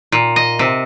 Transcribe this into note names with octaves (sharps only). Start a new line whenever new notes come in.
A#2
D#5
C3